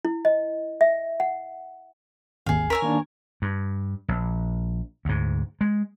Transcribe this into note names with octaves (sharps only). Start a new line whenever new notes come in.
E4
D#5
E5
F#5
G#1 D#2 G#4 F5
A#4 C#5 G#5 E6 B6
D#3 A#3 D4
G2
A#1
D2 G#2
G#3